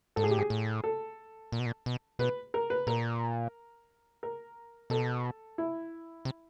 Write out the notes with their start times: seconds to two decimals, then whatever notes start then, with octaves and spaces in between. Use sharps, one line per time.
0.16 G#2 A4
0.24 G#4
0.28 A2 G4
0.38 G#2 G#4
0.50 A2
0.84 A4
1.52 A#2
1.60 B2
1.66 A#2
1.86 B2
2.19 B2 B4
2.54 A#4
2.70 B4
2.87 A#2 A#4
4.23 A#4
4.90 B2 A4
5.58 E4
6.25 C3